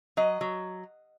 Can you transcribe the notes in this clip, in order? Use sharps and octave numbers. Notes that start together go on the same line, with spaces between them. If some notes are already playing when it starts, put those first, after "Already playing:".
F#3 D#5
F#3